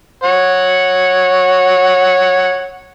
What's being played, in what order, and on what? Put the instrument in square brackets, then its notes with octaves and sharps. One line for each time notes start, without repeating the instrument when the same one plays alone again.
[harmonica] C#5 F#5